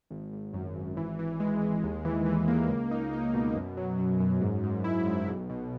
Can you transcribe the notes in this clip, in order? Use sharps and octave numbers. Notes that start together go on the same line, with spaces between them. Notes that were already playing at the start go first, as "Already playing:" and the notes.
G#1
G#1
F#2
G#1
E3
E3
G#3
G#3
D#2
E3
E3
A#3
C#2
D#4
D#4
B2
F#2
F#3
F#2
F#2
G#2
G#2
E4
G#2
B1
B2